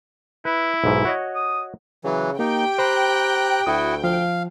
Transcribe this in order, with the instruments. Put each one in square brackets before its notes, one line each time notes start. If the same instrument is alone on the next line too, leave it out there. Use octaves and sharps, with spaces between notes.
[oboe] E4 [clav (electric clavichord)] B4
[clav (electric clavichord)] B1 G#2
F#4 C#5 D#5
[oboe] D#6
[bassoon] C#3 [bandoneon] E3 F#3
[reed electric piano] A#3 [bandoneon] D#4 [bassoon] G4 [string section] G5
[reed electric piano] C5 B5 [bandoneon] A#5 F#6
[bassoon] D2 [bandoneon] E4 F#4 [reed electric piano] D#6
[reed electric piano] F3 [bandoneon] F5